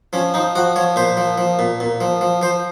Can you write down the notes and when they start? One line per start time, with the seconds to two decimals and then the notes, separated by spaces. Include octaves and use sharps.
0.13 F3 C#4
0.34 F3 D#4
0.55 F3 F#4
0.76 F3 C#5
0.96 A#2 C5
1.17 F3
1.38 F3
1.59 A#2
1.80 A#2
2.01 F3
2.21 F3
2.42 F3 C5